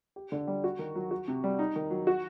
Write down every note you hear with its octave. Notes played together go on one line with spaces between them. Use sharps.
G4
D3
G3
F#4
D#3
F#3
F#4
C3
G3
D#4
D#3
F#3
F#4